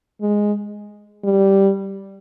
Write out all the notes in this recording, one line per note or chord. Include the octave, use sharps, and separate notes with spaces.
G#3
G3